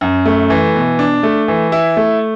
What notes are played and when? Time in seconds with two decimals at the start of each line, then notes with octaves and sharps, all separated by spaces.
0.01 F#2
0.26 A3
0.50 E3
0.75 B2
0.99 D4
1.23 A3
1.48 E3
1.72 E4
1.97 A3